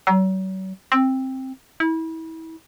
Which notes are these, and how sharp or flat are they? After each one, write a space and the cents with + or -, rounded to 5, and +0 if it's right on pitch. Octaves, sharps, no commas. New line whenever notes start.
F#3 +40
C4 +10
E4 -30